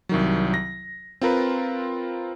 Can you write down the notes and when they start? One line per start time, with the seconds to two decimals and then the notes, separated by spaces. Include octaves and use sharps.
0.09 C2 D#3 F#3
0.54 A#6
1.21 C4 F4 A#4 B4